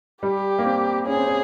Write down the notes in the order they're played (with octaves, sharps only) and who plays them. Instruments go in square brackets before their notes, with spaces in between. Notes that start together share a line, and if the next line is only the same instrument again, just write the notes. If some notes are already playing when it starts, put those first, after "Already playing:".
[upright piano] G3 [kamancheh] G4
[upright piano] A#3
C4
[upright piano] C#4 [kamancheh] G#4
[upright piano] C4
C#4